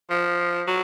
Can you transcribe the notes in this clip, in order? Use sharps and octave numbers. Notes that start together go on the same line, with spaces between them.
F3
F#3